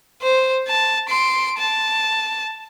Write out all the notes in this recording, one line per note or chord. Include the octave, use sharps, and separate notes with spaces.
C5
A5
C6 D7
A5